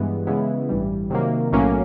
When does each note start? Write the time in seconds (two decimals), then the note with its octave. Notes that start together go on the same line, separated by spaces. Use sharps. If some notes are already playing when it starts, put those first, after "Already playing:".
Already playing: G2 E3 G#3 B3
0.27 C#3 E3 G#3 B3 E4
0.69 A1 G2 E3 G3
1.10 C3 D#3 F#3 A#3
1.52 B1 A2 F#3 A#3 C#4